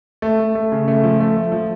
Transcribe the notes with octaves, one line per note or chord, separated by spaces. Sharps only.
A3
A3
A3
C#3
A3
F3
A3
A3
F3